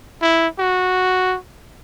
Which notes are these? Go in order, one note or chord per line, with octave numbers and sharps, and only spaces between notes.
E4
F#4